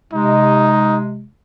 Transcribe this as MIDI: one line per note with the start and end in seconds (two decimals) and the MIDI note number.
0.13 1.26 48
0.13 1.26 56
0.13 1.00 63